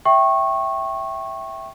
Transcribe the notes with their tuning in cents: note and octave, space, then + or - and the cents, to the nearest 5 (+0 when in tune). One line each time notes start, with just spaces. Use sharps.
E5 +0 G5 -15 C#6 -20